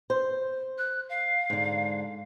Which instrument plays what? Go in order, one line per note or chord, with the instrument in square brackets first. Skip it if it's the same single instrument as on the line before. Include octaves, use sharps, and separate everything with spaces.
[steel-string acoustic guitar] C5
[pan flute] F#6
F5
[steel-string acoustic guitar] G#2 D3